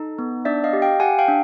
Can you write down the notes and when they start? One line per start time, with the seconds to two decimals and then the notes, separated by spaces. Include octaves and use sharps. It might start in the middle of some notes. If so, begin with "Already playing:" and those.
Already playing: D#4 A4
0.19 B3
0.45 D4 D5 E5
0.64 D#5 F5
0.73 G4
0.82 F5 G5
1.00 G4 F#5 G#5
1.19 F5 G5
1.28 D4